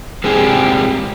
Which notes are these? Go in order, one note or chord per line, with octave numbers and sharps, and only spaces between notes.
G#3 C4 D4 G4 G#4